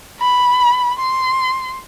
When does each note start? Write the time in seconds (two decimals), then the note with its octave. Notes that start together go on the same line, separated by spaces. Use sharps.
0.20 B5
0.99 C6